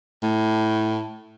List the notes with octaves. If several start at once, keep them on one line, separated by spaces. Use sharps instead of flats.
A2